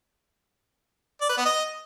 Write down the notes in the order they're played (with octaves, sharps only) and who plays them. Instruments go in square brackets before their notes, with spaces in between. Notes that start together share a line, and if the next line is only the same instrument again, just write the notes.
[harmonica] D5
B4
B3
D#5